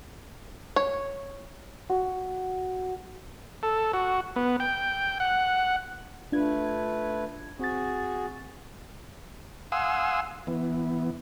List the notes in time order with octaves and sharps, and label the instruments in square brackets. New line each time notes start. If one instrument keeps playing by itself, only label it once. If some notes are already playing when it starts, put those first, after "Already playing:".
[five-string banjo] C#5
[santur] F#4
[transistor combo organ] A4
F#4
B3
G5
F#5
[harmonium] A3 B4 [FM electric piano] D4 F4 G#6
[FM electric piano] C4 A6 [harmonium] F#4 G#4
[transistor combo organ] F5 F#5 G#5 C6 D#6 E6
E3 B3